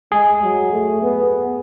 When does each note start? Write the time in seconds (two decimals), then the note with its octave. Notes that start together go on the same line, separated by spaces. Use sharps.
0.12 G#3 G#4
0.43 F#3
0.72 A3
1.03 B3